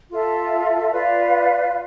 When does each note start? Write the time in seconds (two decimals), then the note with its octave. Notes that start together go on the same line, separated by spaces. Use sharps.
0.10 F4 A4 E5
0.92 F4 B4 D5 F5